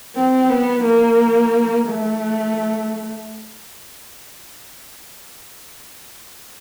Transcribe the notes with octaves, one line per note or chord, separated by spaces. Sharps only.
C4
B3
A#3
A3